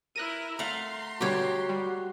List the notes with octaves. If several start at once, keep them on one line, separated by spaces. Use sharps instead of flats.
E4 A#4 F#6 A#6 D#7
A3 F5 F#5 A#5 C6
B2 D3 G3 F#4 G4 C#5
G3